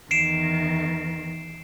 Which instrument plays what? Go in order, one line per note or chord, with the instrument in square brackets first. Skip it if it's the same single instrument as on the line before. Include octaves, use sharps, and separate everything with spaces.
[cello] E2 D#3 [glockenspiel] C7 D7 E7